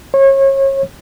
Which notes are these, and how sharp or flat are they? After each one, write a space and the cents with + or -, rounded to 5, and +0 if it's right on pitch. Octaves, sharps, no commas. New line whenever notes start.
C#5 -30